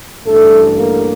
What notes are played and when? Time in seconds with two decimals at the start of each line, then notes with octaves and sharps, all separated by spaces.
0.24 A1 G2 D3 A3 A4
0.78 A#3 A#4